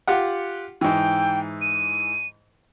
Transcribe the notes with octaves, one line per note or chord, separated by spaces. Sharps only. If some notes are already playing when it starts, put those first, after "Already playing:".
F4 G4 F#5
G#2 E3 G5
D#7